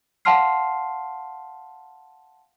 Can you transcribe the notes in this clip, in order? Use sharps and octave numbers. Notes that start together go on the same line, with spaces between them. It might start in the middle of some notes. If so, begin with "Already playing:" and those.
F5 F#5 A5 C6 F6 C7